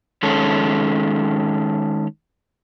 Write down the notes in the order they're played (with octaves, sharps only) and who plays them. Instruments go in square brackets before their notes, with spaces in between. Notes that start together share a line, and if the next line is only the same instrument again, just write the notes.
[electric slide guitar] D#3 G#3 C#4 A4